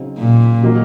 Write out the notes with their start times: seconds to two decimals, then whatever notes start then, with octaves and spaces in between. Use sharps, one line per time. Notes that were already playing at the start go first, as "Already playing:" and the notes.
Already playing: C#3 F#3 C4 D#4
0.18 A#2
0.62 D#3 F#3 A#3 D#4